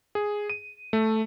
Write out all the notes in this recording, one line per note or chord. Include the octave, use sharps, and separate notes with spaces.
G#4
D#7
A3